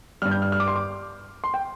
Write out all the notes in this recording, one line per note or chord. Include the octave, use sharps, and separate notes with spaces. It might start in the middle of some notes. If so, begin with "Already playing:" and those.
G2 G3 F6
G6
F6
F6
D6
C6
D6
C6
G5